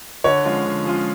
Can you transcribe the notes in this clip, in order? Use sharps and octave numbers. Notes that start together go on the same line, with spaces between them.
D3 C#5
F3 G#3 C#4 F4
D3
F3 G#3 C#4 F4